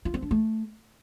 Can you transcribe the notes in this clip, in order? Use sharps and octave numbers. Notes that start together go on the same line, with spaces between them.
F4
C4
D4
A3